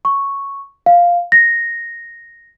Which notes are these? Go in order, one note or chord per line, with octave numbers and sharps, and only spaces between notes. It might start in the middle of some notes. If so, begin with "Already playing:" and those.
C#6
F5
A#6